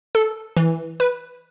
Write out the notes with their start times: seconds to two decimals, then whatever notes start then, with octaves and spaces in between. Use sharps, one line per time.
0.15 A4
0.57 E3
1.00 B4